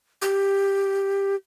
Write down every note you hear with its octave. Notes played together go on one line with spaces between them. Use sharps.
G4